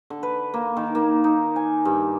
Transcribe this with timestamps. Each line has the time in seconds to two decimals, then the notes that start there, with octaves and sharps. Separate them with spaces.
0.10 D3
0.23 B4
0.54 A#3
0.77 D#3
0.95 A#3
1.24 D#4
1.56 G#5
1.85 G2